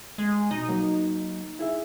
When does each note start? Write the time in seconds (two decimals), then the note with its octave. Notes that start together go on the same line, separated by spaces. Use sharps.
0.18 G#3
0.51 B2 D#4
0.69 F#3 A#3
1.59 E4 G#4 E5